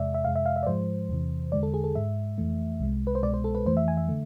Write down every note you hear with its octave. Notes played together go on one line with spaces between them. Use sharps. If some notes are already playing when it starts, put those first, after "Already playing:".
Already playing: E2 C3 G#3 D5 E5
E5
F2 C3 G#3 F5
E5
F5
E5
D5
G#2 F3 G#3 C5
E2 C3 E3
E2 D3 G#3 D5
A4
G#4
A4
G#2 G#3 E5
F2 E3 A3
C2 C3 G#3
B4
C5
C2 B2 G#3 D5
C5
A4
B4
F2 E3 A3 C5
E5
G#5
E5
D3 A3